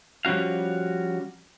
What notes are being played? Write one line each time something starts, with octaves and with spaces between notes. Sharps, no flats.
F3 G3 C#4 F#4 F5